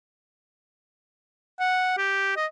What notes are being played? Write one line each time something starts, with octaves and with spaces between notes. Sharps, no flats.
F#5
G4
D#5